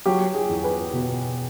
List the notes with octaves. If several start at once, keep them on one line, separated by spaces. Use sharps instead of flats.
F#3 G4
G#4
E2
B4
B2